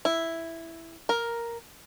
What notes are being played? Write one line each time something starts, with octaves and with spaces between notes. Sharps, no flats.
E4
A#4